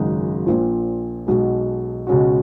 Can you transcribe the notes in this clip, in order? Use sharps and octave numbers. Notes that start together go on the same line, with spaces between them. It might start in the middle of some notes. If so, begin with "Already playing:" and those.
Already playing: G#1 F#2 C#3 G#3 D#4
A#1 A#2 F3
B1 B2 G#3
C#2 B2 G#3 C#4 F#4